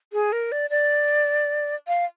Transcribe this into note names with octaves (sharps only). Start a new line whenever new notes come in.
G#4
A#4
D5
D5
F5